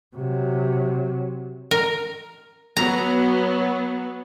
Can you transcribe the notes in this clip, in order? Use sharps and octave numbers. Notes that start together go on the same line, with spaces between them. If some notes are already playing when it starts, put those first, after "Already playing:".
C3 F#3
A#4
F#3 B3 A#5